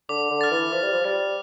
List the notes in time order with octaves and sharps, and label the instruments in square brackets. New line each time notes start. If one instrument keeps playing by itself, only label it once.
[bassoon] D3 [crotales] D6
[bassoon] D3
[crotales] F6 A6
[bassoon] E3
[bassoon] F3 [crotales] D6
[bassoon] G3
F3
[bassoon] G3 [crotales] F6 A6